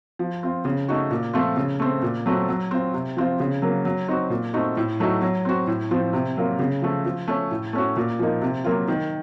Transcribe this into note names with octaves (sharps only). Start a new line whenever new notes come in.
F3
C4 F4
C#3
A3 D#4 F#4
A#2
F3 A3 C4 F4
C#3
A3 C4
A#2
F#3 A3 C4 F#4
F#3
C4 F4
C3
F3 C4 F4
C#3
F#3 A#3
F#3
C4 D#4 F#4
A#2
A3 C4 D#4 F#4
A2
F#3 A3 D#4 F#4
F#3
C4 F#4
A2
F3 C4
C3
F#3 A#3 F4
C#3
F3 A3
F3
A3 C#4
A2
A3 C#4 F#4
A#2
F3 A#3 D#4
C3
F#3 A#3 F4
D#3